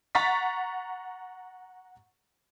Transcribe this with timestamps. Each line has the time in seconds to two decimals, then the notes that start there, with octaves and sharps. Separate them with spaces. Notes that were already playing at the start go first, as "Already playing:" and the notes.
0.15 F#5 A#5 C#6 A6 B6